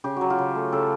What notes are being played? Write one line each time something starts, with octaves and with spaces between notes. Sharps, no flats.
C#3 G4
F#3 F#4
F4 G4
C#3
A3
C#3 G4 A4